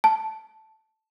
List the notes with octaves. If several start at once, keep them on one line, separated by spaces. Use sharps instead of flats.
A5